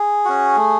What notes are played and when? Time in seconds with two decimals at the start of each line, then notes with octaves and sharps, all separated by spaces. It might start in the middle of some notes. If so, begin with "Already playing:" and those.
Already playing: G#4
0.25 C#4 F#4
0.57 A3